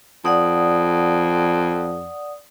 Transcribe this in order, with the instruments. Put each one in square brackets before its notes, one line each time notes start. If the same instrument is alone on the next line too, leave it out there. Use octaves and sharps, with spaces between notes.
[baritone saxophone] F2 [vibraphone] D5 F#5 D#6